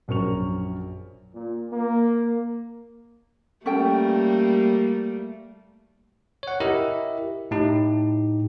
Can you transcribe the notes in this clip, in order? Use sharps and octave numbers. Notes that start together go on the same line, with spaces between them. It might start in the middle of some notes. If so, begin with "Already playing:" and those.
A#1 F#2 A#4 C#6 F7
A#2
A#3
G3 A3 A#3 C#4 A4 G5
C#5 F#5
E4 G4 A#4 D#5 E5
A2 D#4 G4